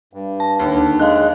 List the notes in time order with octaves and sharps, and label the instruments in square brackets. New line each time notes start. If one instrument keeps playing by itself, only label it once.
[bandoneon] G2
[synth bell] A5
[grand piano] D#2 D3
[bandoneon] G#3 [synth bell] F5 F#6